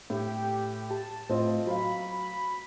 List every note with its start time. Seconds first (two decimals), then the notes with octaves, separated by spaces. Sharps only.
0.10 A2 G4
0.91 A5
1.30 A2 C4 F4 D#5
1.67 F#3 F5 B5
2.11 B5